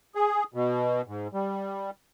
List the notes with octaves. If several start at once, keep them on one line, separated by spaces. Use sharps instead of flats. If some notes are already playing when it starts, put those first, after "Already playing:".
G#4
B2
G#2
G3